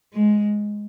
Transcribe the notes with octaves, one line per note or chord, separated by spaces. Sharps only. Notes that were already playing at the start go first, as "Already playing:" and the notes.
G#3